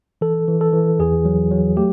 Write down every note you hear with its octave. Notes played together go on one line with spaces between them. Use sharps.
E3 A4
E3
A4
E3
E2 G#4
F#3
F#3
A3 G4